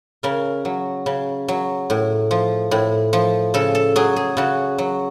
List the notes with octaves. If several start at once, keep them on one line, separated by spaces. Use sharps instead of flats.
C#3 A#4
F#3
C#3
F#3
A2
F3
A2
F3
C#3 A4
A4
F#3 G#4
G#4
C#3 F#4
F#3